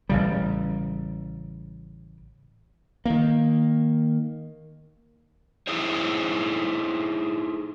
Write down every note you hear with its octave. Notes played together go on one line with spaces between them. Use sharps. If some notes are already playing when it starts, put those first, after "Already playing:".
A1 C#3 G3
D#3 A#3
D#4 E4 G#4 C5 C#5